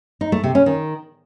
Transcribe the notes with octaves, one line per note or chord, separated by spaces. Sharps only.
D#4
A3
C3
C#4
D#3